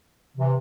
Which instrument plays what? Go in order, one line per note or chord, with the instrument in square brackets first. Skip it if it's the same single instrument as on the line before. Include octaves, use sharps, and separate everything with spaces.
[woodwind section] C3 E3